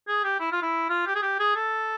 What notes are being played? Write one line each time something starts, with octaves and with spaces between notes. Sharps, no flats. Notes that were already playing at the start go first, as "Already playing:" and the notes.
G#4
G4
E4
F4
E4
F4
G4
G#4
G4
G#4
A4